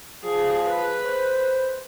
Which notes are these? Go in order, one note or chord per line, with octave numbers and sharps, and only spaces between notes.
F3 G#4
B4
C5